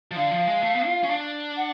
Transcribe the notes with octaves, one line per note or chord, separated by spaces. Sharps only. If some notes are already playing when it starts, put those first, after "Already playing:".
F3
D3 F5
F3
G#3
A3
B3
F4
C#4
D4
F#5